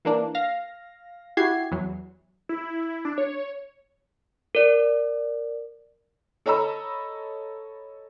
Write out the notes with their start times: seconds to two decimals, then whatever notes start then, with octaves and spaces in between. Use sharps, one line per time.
0.05 E3 A#3 D4
0.35 F5 A#6
1.37 E4 F#4 G4 G#6 C7
1.71 E2 F#3
2.49 E4
3.05 D4
3.18 C#5
4.55 A#4 D5
6.46 A4 C#5 D#5 A#5 B5 E6